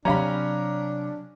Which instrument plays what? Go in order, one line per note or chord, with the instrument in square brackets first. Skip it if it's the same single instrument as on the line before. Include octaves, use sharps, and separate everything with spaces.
[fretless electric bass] C3 F#3 [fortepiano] C#4 G4 F5 [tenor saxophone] D4 [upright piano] A#5 B5